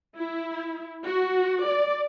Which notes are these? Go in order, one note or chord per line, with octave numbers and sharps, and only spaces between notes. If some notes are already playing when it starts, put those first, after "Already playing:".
E4
F#4
D5